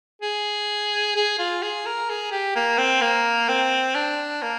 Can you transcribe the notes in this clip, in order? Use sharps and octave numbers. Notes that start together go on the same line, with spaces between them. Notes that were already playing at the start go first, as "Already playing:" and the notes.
G#4
G#4
F4
G#4
A#4
G#4
G4
A#3
C4
A#3
C4
D4
A#3